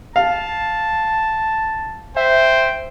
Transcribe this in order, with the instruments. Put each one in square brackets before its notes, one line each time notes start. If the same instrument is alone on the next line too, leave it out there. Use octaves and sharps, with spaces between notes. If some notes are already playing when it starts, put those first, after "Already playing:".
[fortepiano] F5 [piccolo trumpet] A5
[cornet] C5 [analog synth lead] E5 [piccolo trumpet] G5